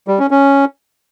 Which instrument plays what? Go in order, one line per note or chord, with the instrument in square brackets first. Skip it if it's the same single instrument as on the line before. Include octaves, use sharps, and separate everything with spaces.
[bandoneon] G3
C#4
C#4